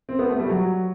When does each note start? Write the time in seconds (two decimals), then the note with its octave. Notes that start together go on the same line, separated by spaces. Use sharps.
0.09 C4
0.19 B3
0.29 A3
0.40 G3
0.49 F#3